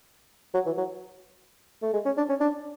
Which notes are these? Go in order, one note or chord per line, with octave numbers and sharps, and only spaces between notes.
F#3
E3
F#3
A3
G#3
C#4
D4
C#4
D4